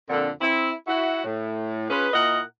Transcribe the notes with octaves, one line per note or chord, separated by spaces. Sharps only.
F2 A#2 D3
C4 E4
E4 F#4
A2
C#4 F4 G#4 B4
A#2 E4 A#4 D#5 F#5